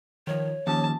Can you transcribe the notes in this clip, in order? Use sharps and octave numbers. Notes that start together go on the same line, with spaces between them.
D#3 F3 C#5
D#2 F3 C#4 A5